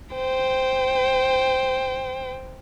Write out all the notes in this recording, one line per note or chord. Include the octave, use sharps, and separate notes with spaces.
C5 G5